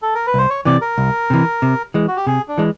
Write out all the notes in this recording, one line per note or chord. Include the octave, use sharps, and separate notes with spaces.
A4
A#4
B4
C2 C5
C#5
C3 E3 D5
A#4
C2
C3 E3
C3
E3 G#3
F#4
G4
C3 G#4
D4
E3 G#3